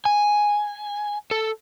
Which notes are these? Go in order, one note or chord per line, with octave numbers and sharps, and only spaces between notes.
G#5
A4